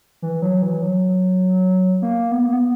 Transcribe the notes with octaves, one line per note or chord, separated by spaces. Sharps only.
E3
F#3
E3
F#3
A#3
B3
A#3
B3